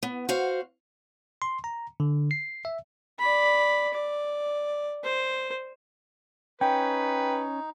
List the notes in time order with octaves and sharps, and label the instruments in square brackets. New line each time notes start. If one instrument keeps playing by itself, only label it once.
[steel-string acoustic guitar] B3
F#4 C5 F5
[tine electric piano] C6
A#5
D3
C7
E5
[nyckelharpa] D5 B5
D5
C5
[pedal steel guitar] C#4 [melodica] D#4 [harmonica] B4 [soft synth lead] G5